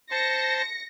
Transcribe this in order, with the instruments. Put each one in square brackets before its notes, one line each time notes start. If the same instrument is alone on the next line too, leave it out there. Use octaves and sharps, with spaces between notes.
[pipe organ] C5 A5 [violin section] A#6 C#7